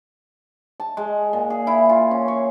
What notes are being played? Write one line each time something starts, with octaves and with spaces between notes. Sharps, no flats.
A5
G#3
A#2
G#4
E4
F4
C#4
C#5